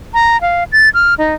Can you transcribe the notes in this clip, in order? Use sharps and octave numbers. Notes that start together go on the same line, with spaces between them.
A#5
F5
A6
F6
D#4